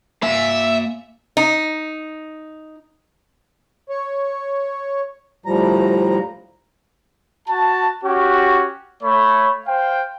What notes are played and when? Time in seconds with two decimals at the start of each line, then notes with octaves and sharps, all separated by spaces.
0.23 A#3 E5 G#5
1.37 D#4
3.89 C#5
5.46 D2 A2 F3 G3 A#5
7.48 F#4 A5
8.04 C#4 F#4 G4
9.03 A3 C#5 B5
9.67 C5 F5 G5